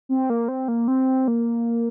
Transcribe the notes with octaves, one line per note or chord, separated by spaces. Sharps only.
C4
A#3
C4
A#3
C4
A#3